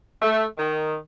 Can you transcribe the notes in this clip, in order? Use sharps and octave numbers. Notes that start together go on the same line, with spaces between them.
A3
D#3